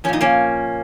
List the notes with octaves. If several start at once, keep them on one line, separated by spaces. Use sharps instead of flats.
A#2 F3 C#4 D#4
A#3 C#4